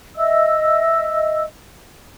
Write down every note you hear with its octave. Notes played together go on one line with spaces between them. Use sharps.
D#5 E5 E6